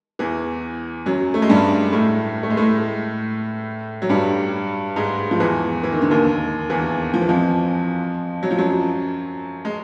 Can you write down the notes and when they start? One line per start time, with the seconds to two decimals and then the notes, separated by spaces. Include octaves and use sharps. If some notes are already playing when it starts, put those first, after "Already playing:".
0.19 E2 E3
1.06 F#2 F#3
1.34 A3
1.42 G#3
1.49 G2 G3
1.92 A2 A3
2.43 A3
2.50 G#3
2.57 A2 A3
4.02 F#3
4.09 G2 G3
4.96 G#2 G#3
5.31 F3
5.40 E2 E3
5.83 E3
5.92 D#3
6.02 D3
6.10 D#2 D#3
6.70 E2 E3
7.14 F3
7.21 E3
7.29 F2 F3
8.43 F#3
8.51 F3
8.58 F#2 F#3
9.65 G#3